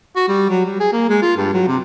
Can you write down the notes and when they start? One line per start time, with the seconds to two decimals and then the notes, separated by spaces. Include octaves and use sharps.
0.16 F#4
0.28 G3
0.50 F#3
0.65 G3
0.80 G#4
0.93 A#3
1.09 G#3
1.22 F4
1.37 G2
1.54 F#3
1.68 C3